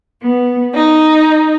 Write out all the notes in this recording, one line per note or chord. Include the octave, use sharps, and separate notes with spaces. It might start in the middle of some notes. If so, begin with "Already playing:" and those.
B3
D#4